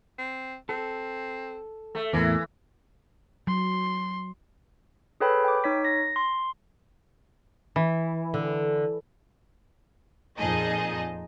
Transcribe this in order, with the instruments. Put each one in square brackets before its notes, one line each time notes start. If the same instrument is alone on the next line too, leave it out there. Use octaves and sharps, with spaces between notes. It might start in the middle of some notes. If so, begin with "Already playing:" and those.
[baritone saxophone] C4
[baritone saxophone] C4 [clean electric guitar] A4
[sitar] A3
[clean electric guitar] E2 A2 [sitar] E3 [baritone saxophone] A#3
[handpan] F#3 [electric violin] C6
[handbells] G#4 A4 B4 C#5 G5 B5
G5 D6
D#4 C#5 B6
A#6
C6
[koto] E3
[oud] D3
[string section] F2 A#2 D#4 G#4 D#5 A5